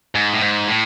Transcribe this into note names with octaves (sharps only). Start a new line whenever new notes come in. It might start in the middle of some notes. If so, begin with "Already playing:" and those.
G#2
A2
G#2
A2